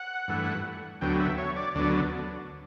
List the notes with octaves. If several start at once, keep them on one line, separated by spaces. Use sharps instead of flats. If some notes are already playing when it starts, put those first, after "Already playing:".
Already playing: F#5
G2 E3 A3
D2 D3 F#3 B3 G5
E5
C#5
D5
D2 D3 F#3 B3 D5